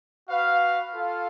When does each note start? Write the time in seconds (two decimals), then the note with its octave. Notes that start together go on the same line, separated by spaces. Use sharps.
0.28 F#4 B4 F5
0.91 F4 A4 F5